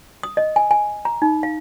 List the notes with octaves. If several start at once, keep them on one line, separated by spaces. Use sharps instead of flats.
D#6
D#5
G#5
G#5
A#5
D#4
F5